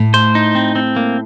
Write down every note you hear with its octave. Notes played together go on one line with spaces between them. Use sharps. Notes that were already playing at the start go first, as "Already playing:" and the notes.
Already playing: A2
C5
D#4
C4
C4
A#3